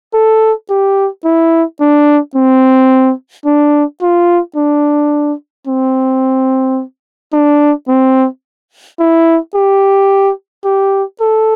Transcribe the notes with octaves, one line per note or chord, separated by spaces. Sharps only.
A4
G4
E4
D4
C4
D4
F4
D4
C4
D4
C4
E4
G4
G4
A4